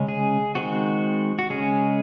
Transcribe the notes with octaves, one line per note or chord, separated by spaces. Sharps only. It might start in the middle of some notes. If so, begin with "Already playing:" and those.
Already playing: C#3 G#3 C#4
G#4
D#3 G#3 C4 F#4
F#4
C#3 G#3 C#4 G#4